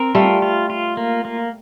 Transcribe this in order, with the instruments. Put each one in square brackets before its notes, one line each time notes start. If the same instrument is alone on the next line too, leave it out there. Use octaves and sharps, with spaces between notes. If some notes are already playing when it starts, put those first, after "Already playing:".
Already playing: [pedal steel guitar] C4 A#4
[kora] G3 A3 [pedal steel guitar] F4
[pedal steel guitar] F4
F4
A#3
A#3